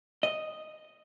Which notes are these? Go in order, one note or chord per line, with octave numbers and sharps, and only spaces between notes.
D#5